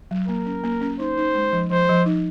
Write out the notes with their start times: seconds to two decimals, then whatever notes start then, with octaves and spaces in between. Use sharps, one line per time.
0.11 F#3
0.28 A#3 A#4
0.46 C#4
0.64 A#3
0.81 C#4
0.99 D#4 C5
1.17 D#4
1.35 G#3
1.53 F3
1.71 F3 C5
1.89 F3
2.06 D#4